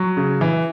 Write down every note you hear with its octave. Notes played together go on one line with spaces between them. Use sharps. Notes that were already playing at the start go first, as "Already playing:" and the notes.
Already playing: F#3
C#3
E3